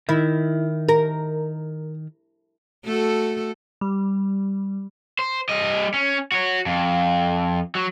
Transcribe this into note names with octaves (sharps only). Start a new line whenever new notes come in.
D#3 E4
A#4
A3 F#4 A4
G3
C5
G3 D#5
C#4
F#4 C#5
F2
F#3